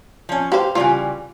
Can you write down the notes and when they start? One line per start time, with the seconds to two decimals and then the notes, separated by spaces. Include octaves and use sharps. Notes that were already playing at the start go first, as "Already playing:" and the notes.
0.29 F3 C#4
0.52 G4 C5 F5
0.75 C#3 E3 G3 F4